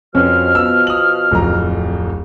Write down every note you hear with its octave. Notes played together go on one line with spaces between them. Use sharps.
F2 B2 F3 C4 C#4 F6
B3 E6
D#6 F#7
D1 F2 A#5